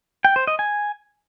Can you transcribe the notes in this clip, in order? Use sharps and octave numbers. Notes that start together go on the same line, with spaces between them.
G5
C5
D#5
G#5